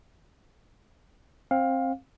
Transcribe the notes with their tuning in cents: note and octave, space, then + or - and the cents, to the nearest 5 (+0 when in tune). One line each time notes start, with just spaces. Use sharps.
C4 +20 F5 +15